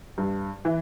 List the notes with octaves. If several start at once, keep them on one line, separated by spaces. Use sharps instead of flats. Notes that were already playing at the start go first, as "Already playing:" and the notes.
G2
E3